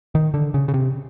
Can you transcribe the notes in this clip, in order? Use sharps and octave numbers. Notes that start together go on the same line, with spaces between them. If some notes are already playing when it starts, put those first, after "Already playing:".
D#3
D3
C#3
C#3
C3